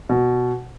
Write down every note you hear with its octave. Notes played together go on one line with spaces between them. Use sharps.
B2